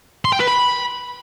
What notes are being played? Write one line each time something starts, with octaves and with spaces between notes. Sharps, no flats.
C6
G5
B4
B5